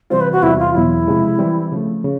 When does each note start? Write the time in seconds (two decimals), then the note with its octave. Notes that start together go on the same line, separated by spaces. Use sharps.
0.10 C3 E3 G3 C4 F4 C5
0.21 B4
0.32 F#4
0.43 E2 C3 E3 G3 E4
0.59 F4
0.74 E2 B2 F#3 E4
1.08 C3 F3 G#3
1.39 E3 G3 C4
1.72 C#3 F3 A3
2.04 C#3